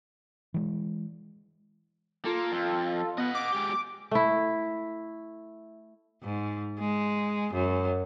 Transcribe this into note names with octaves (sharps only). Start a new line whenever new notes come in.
E3 G#3
A#3 F4 A4
F2
B3 D#5 F#5
D6
G#3 G4
A3 E4
G#2
G#3
F#2